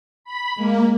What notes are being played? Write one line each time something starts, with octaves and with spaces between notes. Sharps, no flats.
B5
G#3 A#3